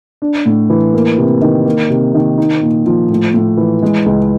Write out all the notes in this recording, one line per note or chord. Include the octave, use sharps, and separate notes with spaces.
D4
A2
E3
A#3
C3
D#3
A#3
C3
D#3
D#4
A#2
F3
A2
A2
E3
G#3
C#2